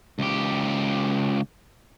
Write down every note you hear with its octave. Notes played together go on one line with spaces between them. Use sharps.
C#2 G4